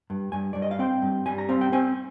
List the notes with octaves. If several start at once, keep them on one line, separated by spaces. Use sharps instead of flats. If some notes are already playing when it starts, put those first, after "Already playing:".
G2
G2 G#5
G2 D5
D#5
F5
C4 G5
G2
G3 G#5
A#5
C4 F5
G5
C4 G#5